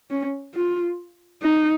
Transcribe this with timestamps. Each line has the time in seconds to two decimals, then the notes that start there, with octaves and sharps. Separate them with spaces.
0.11 C#4
0.55 F4
1.43 D#4